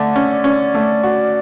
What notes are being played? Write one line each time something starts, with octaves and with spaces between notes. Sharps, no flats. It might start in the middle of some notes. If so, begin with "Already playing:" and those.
Already playing: D3 A3 D5
C#4
C#4
A3
F#4